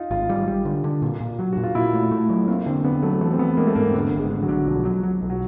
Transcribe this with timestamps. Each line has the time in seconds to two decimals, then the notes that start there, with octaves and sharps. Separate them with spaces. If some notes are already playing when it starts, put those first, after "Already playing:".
Already playing: D#4 F4
0.11 G#1 F4
0.29 G3
0.47 G3
0.65 D3
0.84 D3
1.02 A#2
1.20 A#2
1.39 F#3
1.53 A#2 F#4
1.64 F4
1.75 A#2 E4
1.93 A3
2.11 A3
2.30 F#3
2.48 A#3 C4
2.66 D3 C4
2.84 D3 B3
3.02 F#3 A3
3.21 E3 A3
3.33 C4
3.39 E3 B3
3.57 G#3 A#3
3.67 A3
3.75 G#2 A#3
3.88 C4
3.94 D3 B3
4.12 G#1
4.19 G#3
4.30 D3
4.42 F#3
4.48 D3
4.67 B1 F3
4.85 F#3
5.03 F#3
5.21 B1
5.30 F#3